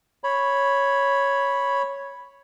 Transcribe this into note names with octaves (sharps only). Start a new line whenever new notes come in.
C#5 B5